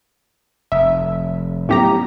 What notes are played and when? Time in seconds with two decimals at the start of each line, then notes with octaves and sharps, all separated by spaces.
0.72 F1 E5
1.69 A2 F#3 B3 C#4 G4 A#5